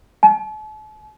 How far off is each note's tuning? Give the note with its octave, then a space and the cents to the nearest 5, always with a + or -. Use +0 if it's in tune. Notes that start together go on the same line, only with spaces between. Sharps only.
A5 -40